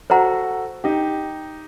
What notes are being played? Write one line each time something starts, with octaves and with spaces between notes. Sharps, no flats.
F#4 A4 C5 F#5 A#5
D#4 G4